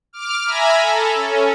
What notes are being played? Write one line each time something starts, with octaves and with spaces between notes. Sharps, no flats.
D6 F6
E5 G#5 A#5 B5
A4
C#4